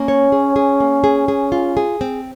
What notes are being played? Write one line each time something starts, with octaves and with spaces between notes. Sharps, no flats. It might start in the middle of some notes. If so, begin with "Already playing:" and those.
Already playing: A#3 C#4
C#5
G#4
G#4
A#3
G#4
G#4
F4
G#4
C4